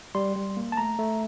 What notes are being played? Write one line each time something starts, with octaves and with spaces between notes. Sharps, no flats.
G3 C6
G3
A#3
A5
A3 A#5
A3